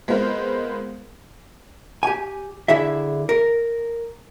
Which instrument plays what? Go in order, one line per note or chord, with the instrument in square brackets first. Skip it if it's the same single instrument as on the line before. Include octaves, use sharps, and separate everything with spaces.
[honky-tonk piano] G#3 B3 C4 F4 A#4 C5
[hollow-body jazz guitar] G4 G#5
D3 E4 G#4 E5
A#4